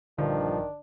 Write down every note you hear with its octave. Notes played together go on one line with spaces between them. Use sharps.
A#1 G2 D3 D#3 F3 D4